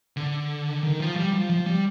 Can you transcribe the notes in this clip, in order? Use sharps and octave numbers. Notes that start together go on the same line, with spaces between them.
D3
D#3
F3
G3
F3
F3
G3